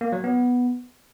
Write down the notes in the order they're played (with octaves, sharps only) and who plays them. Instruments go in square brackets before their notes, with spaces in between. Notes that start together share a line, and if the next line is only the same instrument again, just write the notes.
[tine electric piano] A#3
F#3
B3